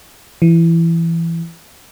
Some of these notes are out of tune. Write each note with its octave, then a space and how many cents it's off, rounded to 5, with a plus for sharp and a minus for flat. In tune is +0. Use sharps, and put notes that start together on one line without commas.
E3 +15